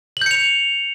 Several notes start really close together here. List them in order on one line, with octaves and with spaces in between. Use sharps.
F#7 G6 C#7 F7